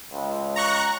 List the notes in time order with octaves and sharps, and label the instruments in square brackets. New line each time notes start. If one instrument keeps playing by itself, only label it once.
[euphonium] C#2
[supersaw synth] A#5 C#6 F#6